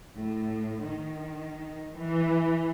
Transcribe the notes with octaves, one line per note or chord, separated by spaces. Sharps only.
A2
D#3
E3